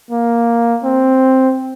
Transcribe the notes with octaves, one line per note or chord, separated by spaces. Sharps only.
A#3
C4